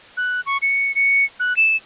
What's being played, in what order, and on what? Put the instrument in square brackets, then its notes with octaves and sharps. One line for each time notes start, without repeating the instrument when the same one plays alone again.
[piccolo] F#6
C#6
C#7
C#7
F#6
E7